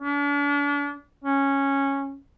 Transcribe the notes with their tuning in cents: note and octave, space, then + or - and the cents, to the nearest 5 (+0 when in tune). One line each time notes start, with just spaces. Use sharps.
D4 -40
C#4 -10